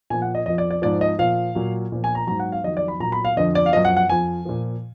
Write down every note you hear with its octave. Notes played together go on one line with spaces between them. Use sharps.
A#2 F3 G#5
F#5
D#5
F2 F3 D#5
D5
D5
G#2 F3 D5
D#5
A#2 F3 F5
A#2 F#3
A#2 F3
G#5
A#5
G#2 F#3 A#5
F#5
F5
F2 D#3 F#3 D#5
D5
B5
A#2 F#3 A#5
B5
F5
F2 D3 F3 D#5
D5
F5
F#2 F3 D#5
F#5
F#5
F2 F3 G#5
A#2 F3